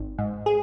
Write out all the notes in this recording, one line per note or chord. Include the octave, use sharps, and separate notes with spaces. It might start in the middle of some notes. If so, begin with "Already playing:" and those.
Already playing: G#1
G#2
G#4